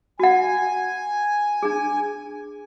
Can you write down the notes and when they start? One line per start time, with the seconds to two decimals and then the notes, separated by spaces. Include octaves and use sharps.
0.20 F#4 F#5 G#5
1.63 D4 G#4